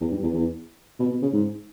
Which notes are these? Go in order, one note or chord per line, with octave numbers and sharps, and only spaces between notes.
E2
G2
E2
E2
B2
B2
C#3
G#2